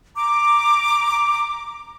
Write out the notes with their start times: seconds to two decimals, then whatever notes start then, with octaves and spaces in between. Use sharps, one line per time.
0.15 A#5 D6